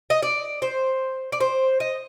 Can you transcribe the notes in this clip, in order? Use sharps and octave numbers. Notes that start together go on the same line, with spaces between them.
D#5
D5
C5
D5
C5
D#5